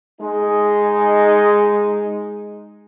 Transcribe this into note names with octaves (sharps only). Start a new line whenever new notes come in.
G#3 D#4